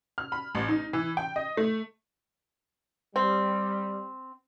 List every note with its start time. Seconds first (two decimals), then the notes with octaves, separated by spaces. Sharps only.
0.18 F6
0.32 B5
0.55 A1
0.68 D#4
0.93 E3
1.17 G5
1.36 D#5
1.57 A3
3.16 G3 C4